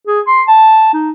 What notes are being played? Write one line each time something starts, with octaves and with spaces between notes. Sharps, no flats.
G#4
C6
A5
D#4